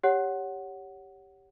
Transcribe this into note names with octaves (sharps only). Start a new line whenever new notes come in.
G4 C#5 F#5